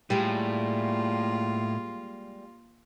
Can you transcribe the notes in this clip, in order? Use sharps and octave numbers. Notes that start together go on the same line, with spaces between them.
A2 G3 G#3 A#3 F4